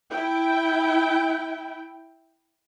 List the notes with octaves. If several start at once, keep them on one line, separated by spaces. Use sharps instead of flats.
E4 G5